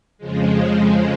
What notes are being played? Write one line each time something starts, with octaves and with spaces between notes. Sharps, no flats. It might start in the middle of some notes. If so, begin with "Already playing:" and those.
F2 C#3 F3 G#3